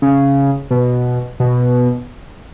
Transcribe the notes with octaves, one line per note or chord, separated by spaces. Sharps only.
C#3
B2
B2